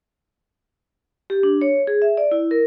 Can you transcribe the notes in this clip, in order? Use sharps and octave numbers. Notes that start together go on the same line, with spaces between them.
G4
D4
C#5
G#4
E5
D5
E4
A#4